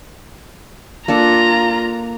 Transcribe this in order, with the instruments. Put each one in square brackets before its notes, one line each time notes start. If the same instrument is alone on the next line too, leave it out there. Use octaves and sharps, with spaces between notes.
[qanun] A#3 D4 A4 [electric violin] F4 A#5